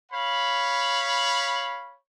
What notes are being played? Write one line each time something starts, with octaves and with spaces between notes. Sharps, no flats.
C#5 F5 B5